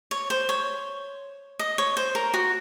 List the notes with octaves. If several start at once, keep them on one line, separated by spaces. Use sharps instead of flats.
C#5
C5
C#5
D#5
C#5
C5
A#4
F#4